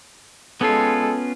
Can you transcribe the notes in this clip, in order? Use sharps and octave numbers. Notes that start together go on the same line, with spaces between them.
G#3 B3 C#4 F4 A4